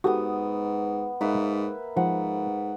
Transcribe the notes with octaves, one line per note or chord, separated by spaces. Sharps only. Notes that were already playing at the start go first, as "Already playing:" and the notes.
G#2 B3 F#4 G4 A4 D#6
G#2 A#3 B4 E5
G#2 F3 F#5